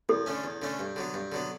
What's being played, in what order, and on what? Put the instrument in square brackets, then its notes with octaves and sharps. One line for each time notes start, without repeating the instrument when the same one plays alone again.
[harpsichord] E2 [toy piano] A4
[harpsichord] D3 A3 C#4
E2
D3 A3 C#4
G2
D3 F#3 B3
G2
D3 F#3 B3